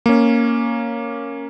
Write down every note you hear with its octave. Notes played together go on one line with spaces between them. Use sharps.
A#3 C#4